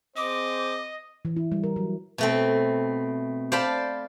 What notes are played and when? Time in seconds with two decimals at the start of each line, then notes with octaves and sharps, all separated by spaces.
0.17 C4 G#4 C5 D#5 D6
1.25 E3
1.36 E4
1.52 G3
1.64 A#4
1.76 F#3
2.18 B2 A3 C4
3.52 C5 D5 F5 G5 A5 B5